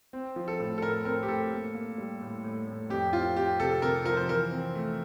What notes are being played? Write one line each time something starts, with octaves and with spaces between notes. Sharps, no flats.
C4
F3
A4
A2
A4
A2 A#4
C4 A#4
G4
A2 A4
A#3
A#3
G3
A2
A2
A2
F2 G4
C4 F4
C4 G4
C3 A4
C3 A#4
F3 A#4
C5
E3 A#4
C4
A3